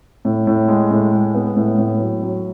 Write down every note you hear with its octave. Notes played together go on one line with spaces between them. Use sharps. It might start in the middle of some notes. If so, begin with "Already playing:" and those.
A2
A2
G#3
A2
G#3
B3
A2
A2
F#3
F#3